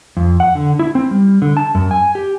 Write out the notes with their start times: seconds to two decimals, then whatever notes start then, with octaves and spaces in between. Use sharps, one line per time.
0.17 F2
0.40 F#5
0.55 D3
0.79 E4
0.95 C4
1.11 G3
1.42 D3
1.57 A5
1.75 F#2
1.91 G#5
2.15 G4